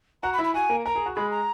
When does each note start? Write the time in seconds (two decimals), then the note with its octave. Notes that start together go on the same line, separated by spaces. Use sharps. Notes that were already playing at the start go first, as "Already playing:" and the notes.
0.23 F#4 F#5 A#5
0.33 B5
0.39 E4 E5
0.44 B5
0.54 F#4 F#5 G#5
0.69 A#3 A#4
0.86 A#4 A#5
0.95 G#4
1.06 F#4
1.16 G#3 G#4 B5
1.31 A#5